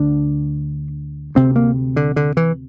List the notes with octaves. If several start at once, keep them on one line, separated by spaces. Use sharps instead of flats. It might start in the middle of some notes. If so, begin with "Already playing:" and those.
Already playing: D2 D3 D4
D2 C3 C4
A#3
D3
D3
E3